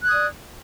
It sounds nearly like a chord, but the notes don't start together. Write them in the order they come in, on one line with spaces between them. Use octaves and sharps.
F#6 G#6 D#6 D5